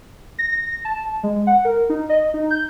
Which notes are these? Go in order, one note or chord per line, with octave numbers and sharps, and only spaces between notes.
A#6
A5
G#3
F#5
A#4
D#4
D#5
D#4
G6